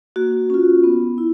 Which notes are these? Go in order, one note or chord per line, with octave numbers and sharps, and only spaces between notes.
A#3 F#4
C#4 F4
B3
E4